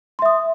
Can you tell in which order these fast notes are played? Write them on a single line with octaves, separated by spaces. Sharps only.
C6 E5 D#6